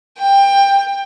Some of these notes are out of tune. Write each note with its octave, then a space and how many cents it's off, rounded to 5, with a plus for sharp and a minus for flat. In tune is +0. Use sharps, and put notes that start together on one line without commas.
G5 +20